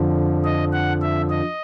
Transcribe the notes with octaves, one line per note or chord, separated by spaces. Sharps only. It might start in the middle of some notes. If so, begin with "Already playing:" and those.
Already playing: F2 D3 F3
D#5
F#5
E5
D#5